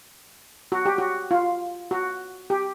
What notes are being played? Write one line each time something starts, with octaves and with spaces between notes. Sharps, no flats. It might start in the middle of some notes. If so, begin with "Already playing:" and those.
F#4
G4
F#4
F4
F#4
G4